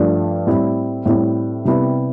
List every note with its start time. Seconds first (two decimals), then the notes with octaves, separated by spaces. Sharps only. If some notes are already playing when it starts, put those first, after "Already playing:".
Already playing: G2 F3 A3 D4
0.47 A2 G3 C4 E4
1.06 A2 G3 C4 E4
1.65 C3 G3 B3 E4